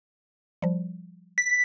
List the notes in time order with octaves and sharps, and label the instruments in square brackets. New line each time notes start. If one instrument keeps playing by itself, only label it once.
[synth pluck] F3 G3
[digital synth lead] B6